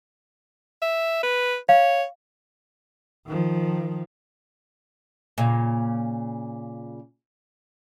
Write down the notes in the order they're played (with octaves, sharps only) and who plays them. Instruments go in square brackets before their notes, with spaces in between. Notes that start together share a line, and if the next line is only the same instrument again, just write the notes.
[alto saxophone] E5
B4
[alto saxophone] C#5 [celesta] F5
[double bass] D#3 F3
[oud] A#2 C#3